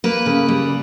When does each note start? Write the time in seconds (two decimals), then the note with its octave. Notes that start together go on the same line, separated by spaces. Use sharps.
0.04 A#3 B4
0.26 C#3
0.48 G3